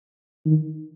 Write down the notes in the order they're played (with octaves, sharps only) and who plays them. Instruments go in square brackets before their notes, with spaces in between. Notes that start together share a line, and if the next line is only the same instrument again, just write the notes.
[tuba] D#3